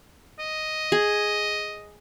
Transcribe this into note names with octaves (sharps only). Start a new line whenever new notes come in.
D#5
G#4